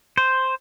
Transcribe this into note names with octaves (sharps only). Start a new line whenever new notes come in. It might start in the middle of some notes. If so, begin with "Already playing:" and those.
C5